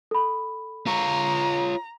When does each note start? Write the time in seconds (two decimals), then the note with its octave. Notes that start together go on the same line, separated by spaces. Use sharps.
0.11 A4 B5
0.87 F4 C#5 A#5